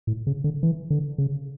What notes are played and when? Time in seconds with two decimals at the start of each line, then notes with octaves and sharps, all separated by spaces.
0.07 A2
0.27 C#3
0.44 D3
0.63 E3
0.90 D3
1.18 C#3